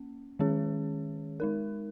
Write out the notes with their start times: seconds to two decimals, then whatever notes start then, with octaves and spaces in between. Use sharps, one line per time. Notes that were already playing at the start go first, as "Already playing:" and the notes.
Already playing: A#3 C#4
0.39 D#3 G#3 C#4 G#4 C#5
1.40 G#3 D#4 A#4